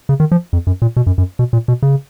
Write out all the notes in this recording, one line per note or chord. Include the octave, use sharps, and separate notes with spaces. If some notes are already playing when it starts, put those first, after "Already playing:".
C#3
D#3
F3
F2
F#2
A#2
B2
F#2
F#2
B2
A#2
B2
C#3